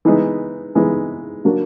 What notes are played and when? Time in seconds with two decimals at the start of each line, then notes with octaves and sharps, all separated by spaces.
0.05 E3 G#3 B3 D#4
0.75 E3 G#3 B3 D#4
1.45 F#3 A#3 D4 F#4 A#4